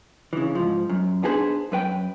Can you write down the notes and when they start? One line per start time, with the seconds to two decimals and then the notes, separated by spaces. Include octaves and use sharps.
0.33 C#3 E3
0.55 G#2 F3
0.89 F#2
1.23 B3 D4 D#4 G#4 B4 C5
1.72 F#2 B4 G5